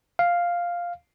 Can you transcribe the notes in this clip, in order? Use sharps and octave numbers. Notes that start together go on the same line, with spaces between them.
F5